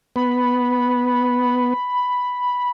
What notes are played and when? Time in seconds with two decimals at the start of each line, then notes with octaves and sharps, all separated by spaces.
0.16 B3 B5